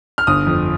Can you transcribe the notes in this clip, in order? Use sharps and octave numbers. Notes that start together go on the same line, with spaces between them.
F6
G1 D#6
F2